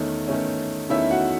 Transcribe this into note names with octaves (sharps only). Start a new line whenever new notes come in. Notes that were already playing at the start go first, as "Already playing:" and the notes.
Already playing: E2 D#3 A3 C#4
E2 D#3 A3 C#4
E2 D#3 A3 C#4 E4 E5
F#4 F#5